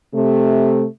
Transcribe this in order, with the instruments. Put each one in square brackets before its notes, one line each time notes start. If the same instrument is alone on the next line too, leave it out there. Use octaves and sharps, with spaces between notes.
[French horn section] C3 A3